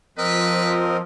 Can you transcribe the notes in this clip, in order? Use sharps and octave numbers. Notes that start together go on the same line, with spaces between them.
F3 C4 A#4 B4 D#5